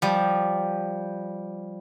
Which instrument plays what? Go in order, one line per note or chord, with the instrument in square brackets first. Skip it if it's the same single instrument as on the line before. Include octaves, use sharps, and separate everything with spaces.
[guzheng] F3 G3